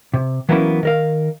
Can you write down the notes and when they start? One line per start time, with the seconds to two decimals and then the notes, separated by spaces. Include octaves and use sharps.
0.14 C3
0.49 E3 F#3 A#3 B3 C#4 E4
0.83 D#3 A#4 F5